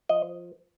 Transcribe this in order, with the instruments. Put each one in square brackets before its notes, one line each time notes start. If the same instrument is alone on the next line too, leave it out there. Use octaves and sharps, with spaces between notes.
[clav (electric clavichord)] F3 D#5